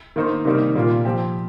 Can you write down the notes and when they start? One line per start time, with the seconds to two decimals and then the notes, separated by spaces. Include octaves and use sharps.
0.16 D#3 A#3 D#4 C5
0.45 C3 D#3 G3 A#3 D#4
0.75 A#2 G3 A#3 F4
1.05 F3 C4 G4